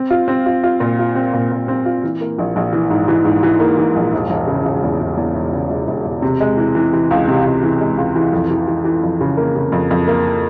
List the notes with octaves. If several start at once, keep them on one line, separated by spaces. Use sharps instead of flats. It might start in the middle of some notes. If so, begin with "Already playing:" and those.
Already playing: C4
F4
C4
F4
F4
A#2
F4
C4
A#2
A#2
C4
F4
E3
A#3
A#1
A#1
E3
G#2
E3
G#2
E3
A#3
E3
A#1
E1
E1
C#3
E1
E2
E1
E2
E1
C#3
E1
E1
E1
C3
G#3
E3
E3
E3
C#2
C3
C#2
E3
G#3
C#2
E3
F2
E3
E3
E3
F2
C#3
A#3
C#3
F2
F2
A#3